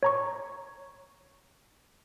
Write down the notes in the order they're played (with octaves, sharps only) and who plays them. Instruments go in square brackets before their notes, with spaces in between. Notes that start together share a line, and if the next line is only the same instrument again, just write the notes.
[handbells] C#5 A#5 C#6